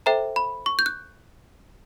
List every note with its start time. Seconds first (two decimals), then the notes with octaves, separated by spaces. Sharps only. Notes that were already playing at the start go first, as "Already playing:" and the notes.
0.06 A4 C5 E5 G5 A#5
0.36 B5
0.66 C#6
0.79 G6
0.86 F#6